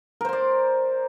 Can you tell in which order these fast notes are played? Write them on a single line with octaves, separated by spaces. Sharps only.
A#4 C5 C6 D5